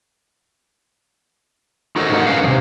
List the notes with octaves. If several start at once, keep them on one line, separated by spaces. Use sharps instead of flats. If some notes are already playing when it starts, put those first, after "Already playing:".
D#4 F#4 A4 A#4 C5 D#5
G#2 D3 D#4 A#4 F#5
C#4 B4 F5
C3 F3